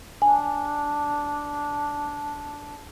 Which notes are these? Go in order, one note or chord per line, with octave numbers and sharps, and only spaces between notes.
D4 G#5